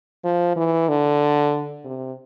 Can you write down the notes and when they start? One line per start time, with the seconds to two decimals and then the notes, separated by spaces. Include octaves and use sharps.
0.24 F3
0.56 E3
0.89 D3
1.85 C3